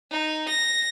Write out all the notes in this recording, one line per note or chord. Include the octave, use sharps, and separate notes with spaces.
D#4
A#6